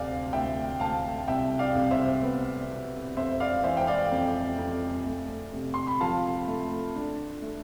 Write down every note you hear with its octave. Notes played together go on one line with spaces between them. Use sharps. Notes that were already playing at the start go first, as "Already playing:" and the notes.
Already playing: D2 C3 D5 F5
D2 E5 G5
D2 F5 A5
C2 E5 G5
D5 F5
C2
C5 E5
B3
B2
F2 C5 E5
D5 F5
E3 C5 E5
G5
D5 F5
F2
F2
A3
C3
C6
B5
F3 F5 A5
A3
D4
A3